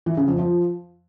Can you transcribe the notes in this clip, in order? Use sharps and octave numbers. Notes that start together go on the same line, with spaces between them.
E3
C#3
F2
F3